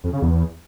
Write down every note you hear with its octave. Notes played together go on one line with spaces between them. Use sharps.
F2
C#3
E2